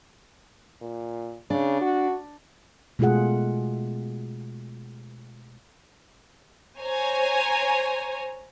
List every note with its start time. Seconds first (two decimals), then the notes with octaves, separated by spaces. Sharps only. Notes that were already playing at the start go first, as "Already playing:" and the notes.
0.82 A#2
1.50 C#3 D4
1.81 F#4
2.99 B2 G#3 A3 F4 G#4 F#5
6.79 C5 C#5 G#5 A#5